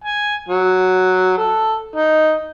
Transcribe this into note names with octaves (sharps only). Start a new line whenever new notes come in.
G#5
F#3
A4
D#4